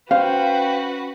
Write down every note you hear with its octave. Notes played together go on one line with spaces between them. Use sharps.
C#4 F#4 B4 C5 F5 G5